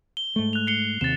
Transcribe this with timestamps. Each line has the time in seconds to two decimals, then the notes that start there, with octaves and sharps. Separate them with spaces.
0.17 G7
0.36 G#2 A3
0.53 F#6 F7
0.67 C7 C#7 G7
1.01 D#2 C3 C4 A6 E7